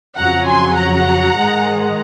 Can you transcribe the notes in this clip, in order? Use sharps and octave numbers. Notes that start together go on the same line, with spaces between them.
F2 C#3 F#3 F#5 A#5
G#5 C6
F#5 A#5
G#2 D#3 G#3